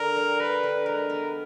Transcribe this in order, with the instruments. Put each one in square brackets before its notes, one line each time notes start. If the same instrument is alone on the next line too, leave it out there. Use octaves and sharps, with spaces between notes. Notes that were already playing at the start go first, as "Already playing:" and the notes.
Already playing: [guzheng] D3 [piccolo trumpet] A#4
[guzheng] G3
[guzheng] G3 [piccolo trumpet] B4
[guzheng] D3
[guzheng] G#3 [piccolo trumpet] A#4
[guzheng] B3